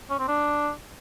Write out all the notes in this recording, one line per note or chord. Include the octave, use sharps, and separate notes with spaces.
C#4
C4
D4